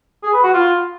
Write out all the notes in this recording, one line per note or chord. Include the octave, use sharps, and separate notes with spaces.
G#4
B4
F#4
F4